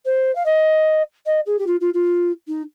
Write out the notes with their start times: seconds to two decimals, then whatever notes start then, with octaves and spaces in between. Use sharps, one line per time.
0.05 C5
0.35 F5
0.45 D#5
1.26 D#5
1.46 G#4
1.58 G4
1.66 F4
1.80 F4
1.94 F4
2.48 D#4